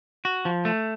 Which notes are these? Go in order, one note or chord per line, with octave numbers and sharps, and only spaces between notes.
F#4
F3
A3